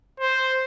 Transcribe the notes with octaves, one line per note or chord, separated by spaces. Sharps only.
C5